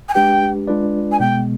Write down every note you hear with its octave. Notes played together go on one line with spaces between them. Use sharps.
G#5
G#3 D4 G4 B4 G5
G#3 D4 F4 B4 D5
G#5
B2 G#3 B3 G5